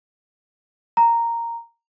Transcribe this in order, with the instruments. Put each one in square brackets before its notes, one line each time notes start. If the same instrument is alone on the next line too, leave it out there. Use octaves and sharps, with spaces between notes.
[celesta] A#5